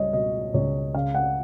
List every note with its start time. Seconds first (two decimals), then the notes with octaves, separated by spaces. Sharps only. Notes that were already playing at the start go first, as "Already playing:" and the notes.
Already playing: C#2 G3 C#5 D#5
0.13 B2 D#5
0.54 C#2 C#5
0.95 C#3 F5
1.14 F#5